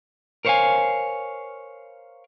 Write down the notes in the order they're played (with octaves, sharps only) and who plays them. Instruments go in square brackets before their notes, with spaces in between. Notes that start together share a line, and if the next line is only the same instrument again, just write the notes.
[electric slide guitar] A#4 C5 C#5 E5 F5 G#5